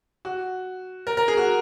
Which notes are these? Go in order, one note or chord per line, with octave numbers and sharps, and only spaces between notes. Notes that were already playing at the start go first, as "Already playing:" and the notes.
F#4
A#4
A#4
G#4
F#4